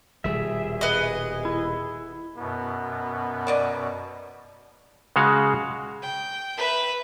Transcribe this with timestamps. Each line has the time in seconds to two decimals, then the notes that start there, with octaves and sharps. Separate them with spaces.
0.24 D#1 B2 G3 G#4 E5
0.81 B3 D#5
1.45 E4
2.38 F#2 B2 B3
3.47 F#3 D5 D#5
5.16 C#3 G#3 F#4 F5
6.02 G5
6.57 B4 E5